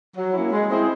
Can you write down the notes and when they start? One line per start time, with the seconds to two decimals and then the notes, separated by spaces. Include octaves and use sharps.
0.16 F#3
0.34 A#3 C#4 E4
0.52 G#3
0.70 C4 E4 G#4 C5